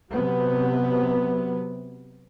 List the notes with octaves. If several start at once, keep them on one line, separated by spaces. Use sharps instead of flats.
C3 F#3 B3